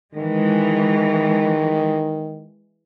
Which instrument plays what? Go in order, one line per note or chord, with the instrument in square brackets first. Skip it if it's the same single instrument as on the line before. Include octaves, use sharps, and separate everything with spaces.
[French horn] D#3 [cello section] E3 G#3